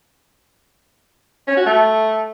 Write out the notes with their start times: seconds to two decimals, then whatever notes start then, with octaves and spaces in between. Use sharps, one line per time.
1.47 C#4
1.57 F#4
1.66 A3